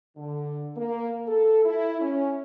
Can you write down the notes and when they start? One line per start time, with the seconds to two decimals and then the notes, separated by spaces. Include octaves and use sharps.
0.17 D3
0.77 A#3
1.27 A4
1.65 E4
2.00 C#4